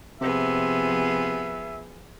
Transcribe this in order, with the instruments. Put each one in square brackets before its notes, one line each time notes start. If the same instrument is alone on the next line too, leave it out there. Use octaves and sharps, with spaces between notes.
[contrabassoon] C3 [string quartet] F3 B3 G#4 [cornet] E5